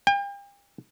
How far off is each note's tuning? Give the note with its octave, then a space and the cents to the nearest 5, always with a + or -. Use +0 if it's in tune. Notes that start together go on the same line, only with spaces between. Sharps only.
G5 +40